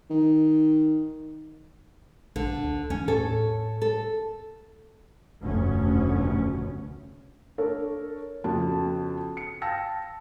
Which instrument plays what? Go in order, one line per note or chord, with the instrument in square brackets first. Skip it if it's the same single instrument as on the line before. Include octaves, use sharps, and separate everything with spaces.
[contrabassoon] D#3
[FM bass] A#1 [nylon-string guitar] D3
[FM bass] D2
[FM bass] E2 [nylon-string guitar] C#4
[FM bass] A2 [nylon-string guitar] A4 C#5
[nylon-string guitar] A4
[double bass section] F1 D2 G2 B2 C#4
[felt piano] D4 A4 A#4 C#5
F2 C#3 B3 F#4 A5
C#7
F5 G5 A5 E6 A#6